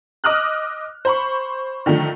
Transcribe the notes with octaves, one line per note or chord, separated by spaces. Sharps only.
D#5 D6 D#6 F6 F#6
C5 B5 C#6
D3 D#3 F3 A3